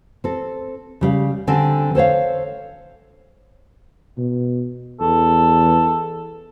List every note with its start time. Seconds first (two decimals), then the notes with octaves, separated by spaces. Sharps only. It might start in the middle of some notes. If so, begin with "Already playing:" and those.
0.24 C4 A4
1.01 C#3 G3 F5
1.47 D3 G3 C4 A4 G#5
1.95 A4 C5 C#5 F5
4.18 B2
5.01 E2 A4